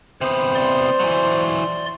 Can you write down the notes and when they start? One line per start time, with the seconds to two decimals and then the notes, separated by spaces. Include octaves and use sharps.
0.21 C3 B3 C5
0.55 D5 C6
1.00 E3 F#3